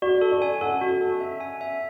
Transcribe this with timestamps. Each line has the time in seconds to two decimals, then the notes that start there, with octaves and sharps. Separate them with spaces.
0.02 F#4 D5
0.21 A4
0.31 D5
0.42 G#5
0.61 A4 F#5
0.81 F#4
1.01 A4
1.20 E5
1.40 G#5
1.61 E5